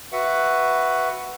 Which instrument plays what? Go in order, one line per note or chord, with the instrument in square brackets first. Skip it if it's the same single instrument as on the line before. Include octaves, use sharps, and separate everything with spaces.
[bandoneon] F#4 B4 E5 F#5